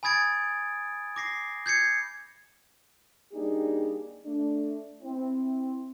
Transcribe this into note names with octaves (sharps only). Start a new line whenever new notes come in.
G#5 B5 D#6 G#6 A6 D7
D6 A#6 C7
G6 G#6 C7 C#7
G3 A#3 D4 D#4 G4 G#4
A3 D4
C4 E4